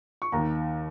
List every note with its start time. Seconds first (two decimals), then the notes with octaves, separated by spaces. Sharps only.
0.22 C#6
0.32 D#2 D#3 A#5